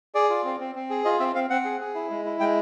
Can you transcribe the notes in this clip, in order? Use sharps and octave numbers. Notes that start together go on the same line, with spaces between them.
G#4 D5
F4
C4
C4
C4
G#4
F4 D#5
C4 E5
C4 F5
C4 F#5
G#4
G#4
E4
G#3
E4
G#3 G5